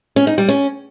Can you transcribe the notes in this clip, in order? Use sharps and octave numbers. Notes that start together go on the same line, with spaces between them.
C#4
D#4
G3
C#4